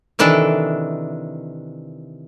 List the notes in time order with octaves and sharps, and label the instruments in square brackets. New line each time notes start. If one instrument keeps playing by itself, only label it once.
[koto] C3 D#3 E3 D4 A4